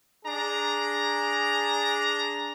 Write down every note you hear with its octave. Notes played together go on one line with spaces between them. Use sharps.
D4 G#4 A#5